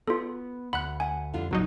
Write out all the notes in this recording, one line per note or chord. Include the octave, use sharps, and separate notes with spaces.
B3 F4 A4
D2 F#5 B5 F#6
E5 F#5 G#5
F2 D3 G3 F4
B1 G2 A#2 C#3 F#3 D#4